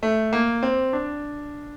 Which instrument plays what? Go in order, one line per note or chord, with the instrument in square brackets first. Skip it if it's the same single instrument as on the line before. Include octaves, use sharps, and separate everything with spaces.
[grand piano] A3
A#3
C4
D4